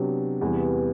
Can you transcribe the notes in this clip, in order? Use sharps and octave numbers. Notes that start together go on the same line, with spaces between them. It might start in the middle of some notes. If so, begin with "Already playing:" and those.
Already playing: C3 F#3 B3 D4
E2 C3 E3 G3 B3